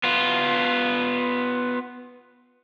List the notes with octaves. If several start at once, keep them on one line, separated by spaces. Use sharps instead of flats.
B3 F4